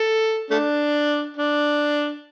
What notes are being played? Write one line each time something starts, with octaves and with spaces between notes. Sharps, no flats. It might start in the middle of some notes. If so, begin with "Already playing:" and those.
Already playing: A4
A3 D4
D4